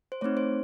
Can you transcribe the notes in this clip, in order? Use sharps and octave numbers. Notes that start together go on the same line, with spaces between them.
C5
A3 C4 D#4 C#5
C5